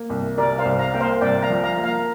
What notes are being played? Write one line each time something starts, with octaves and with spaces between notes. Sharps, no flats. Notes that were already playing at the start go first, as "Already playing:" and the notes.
Already playing: A#3
C2
C3 A#4 D5
C5 F5
C2
F5 A#5
A#3 G5
C5 F5
C2 D5 G5
F5 A#5
F3
F5 A#5
A#3
F5 A#5